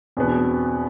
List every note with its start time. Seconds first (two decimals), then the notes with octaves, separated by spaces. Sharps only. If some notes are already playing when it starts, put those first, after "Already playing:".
0.17 E2 B2 B3 C4
0.27 D4
0.38 C4